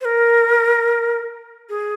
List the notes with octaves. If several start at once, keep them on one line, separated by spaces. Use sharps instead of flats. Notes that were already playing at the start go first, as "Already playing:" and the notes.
C5
A#4
G#4